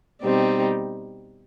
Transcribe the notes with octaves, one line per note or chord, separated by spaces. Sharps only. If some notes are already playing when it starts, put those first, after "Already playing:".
B2 G3 C4 D#4